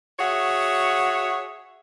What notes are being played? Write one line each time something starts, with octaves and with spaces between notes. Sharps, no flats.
F#4 G#4 C#5 E5 F#5